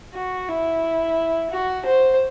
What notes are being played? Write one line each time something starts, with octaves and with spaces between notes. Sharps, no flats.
F#4
E4
F#4
C5